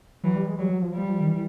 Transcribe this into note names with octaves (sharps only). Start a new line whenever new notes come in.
E3 F#3
G3
G#3
F#3 G3
F#3
F3
G3
D#3
E3